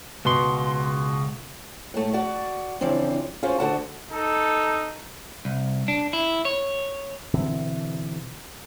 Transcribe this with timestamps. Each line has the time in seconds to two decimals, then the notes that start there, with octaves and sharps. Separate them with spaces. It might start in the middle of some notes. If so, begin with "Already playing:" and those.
0.25 C#2 B2 C6
1.94 A2 A3
2.13 F#4 D5
2.81 C#3 E3 F3 C4 D4
3.43 C#4 F4 F#4 C5
3.59 D2 D3 F#4 A5
4.11 D#4 A4
5.45 C2
5.88 D4
6.13 E4
6.45 C#5
7.34 B2 D3 E3 C4